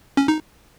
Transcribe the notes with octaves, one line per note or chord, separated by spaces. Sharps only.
C#4
D#4